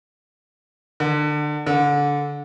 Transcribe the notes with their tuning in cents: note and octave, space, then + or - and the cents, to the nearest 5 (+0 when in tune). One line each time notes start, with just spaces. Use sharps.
D3 +25
D3 -20